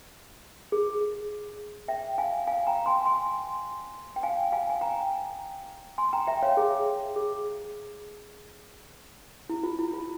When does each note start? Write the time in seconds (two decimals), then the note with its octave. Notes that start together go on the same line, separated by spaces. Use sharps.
0.72 G#4
1.88 E5 G5
2.18 F5 G#5
2.47 F5 G#5
2.67 G5 A#5
2.86 G#5 C6
3.06 G#5 C6
4.16 G5
4.23 F5 G#5
4.52 F5 G#5
4.69 G#5
4.81 G5 A#5
5.98 G#5 C6
6.13 G5 A#5
6.27 E5 G5
6.42 C#5 F5
6.57 G#4
7.16 G#4
9.49 E4
9.63 F4
9.79 E4
9.93 F4